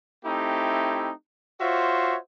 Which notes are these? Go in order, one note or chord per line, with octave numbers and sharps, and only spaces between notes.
A3 C4 D#4 E4 G4
F4 F#4 C5 C#5 E5